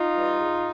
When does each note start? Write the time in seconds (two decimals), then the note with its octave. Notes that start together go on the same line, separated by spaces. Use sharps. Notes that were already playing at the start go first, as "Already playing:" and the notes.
Already playing: D#4 F4
0.13 E3 G3
0.39 G#2